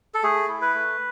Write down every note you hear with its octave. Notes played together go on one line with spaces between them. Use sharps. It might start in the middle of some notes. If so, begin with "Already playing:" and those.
A4
A3 G#4
E4
B4
A3